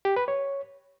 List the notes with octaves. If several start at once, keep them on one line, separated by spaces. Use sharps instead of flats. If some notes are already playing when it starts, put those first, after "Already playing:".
G4
B4
C#5